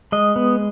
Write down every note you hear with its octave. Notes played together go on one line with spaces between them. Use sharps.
G#3 D#5
B3